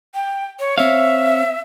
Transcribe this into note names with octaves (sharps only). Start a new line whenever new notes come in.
G5
C#5
C4 C#5 E5 F5